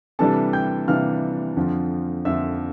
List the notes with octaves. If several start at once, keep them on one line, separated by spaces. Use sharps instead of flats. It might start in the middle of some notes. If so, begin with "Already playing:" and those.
C3 E3 G3 D4 A4 A5
G5 G6
C3 E3 G3 D4 F5 F6
F2 D3 F3
F2 D3 F3 E5 E6